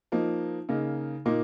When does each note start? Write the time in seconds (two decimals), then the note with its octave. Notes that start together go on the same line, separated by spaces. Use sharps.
0.12 F3 A#3 D#4
0.69 C#3 A#3 D#4
1.26 A#2 A#3 D#4